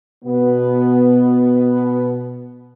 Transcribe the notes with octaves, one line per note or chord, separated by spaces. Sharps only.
B2 B3